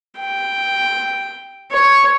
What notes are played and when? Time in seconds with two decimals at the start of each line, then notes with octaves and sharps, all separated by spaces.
0.19 G5
1.72 C#5